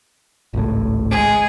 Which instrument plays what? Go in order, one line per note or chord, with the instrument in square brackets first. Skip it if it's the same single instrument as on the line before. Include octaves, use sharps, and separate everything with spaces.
[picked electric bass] G#1 C#2 A2
[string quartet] G#3 G#4